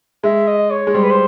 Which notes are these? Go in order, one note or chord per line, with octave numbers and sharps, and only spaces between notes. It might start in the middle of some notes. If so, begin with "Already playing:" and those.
G#3 E5
D#5
C#5
G#3
G3 C5
B4
C5